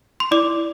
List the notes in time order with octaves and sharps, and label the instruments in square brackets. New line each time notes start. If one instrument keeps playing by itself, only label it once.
[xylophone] C6
[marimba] E4 [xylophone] D5 D6
[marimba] E4